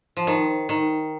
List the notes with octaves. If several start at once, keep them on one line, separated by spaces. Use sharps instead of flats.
F3
D#3
D#3